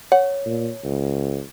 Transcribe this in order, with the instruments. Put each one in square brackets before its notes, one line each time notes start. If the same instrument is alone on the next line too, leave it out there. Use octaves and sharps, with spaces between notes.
[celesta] C#5 [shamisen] F#5
[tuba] A#2
C#2